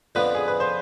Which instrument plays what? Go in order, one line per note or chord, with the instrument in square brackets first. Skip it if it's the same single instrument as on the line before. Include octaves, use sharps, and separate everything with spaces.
[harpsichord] F2 D3 F3 B3 [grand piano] B4
[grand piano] G#4
B4
C5